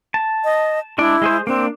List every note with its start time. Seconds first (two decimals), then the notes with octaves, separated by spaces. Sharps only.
0.14 A5
0.44 D#5
0.98 G#3 D4 E4 D5
1.22 G#3 G#4 C5
1.47 A#3 C4 D4